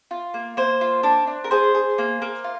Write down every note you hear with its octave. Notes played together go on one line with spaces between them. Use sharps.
F4
A#3
A#3 C5
F4
D4
D4
A#4
G#4 C5
G#4
A#3
A#3
F4